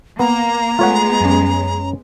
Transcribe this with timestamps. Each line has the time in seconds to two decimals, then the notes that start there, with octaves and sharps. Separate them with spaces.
0.19 A#3 B3 A#5
0.79 G#3 A3 B3 F4 G#4 C#5 F#5
1.21 F#2 C#4